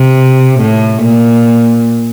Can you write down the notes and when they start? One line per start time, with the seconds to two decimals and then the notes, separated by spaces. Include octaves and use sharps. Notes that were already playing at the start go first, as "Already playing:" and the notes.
Already playing: C3
0.60 A2
1.03 A#2